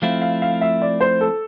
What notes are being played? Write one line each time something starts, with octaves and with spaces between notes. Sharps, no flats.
F3 A3 C4 E4 F5
F5
F5
E5
D5
C5
A4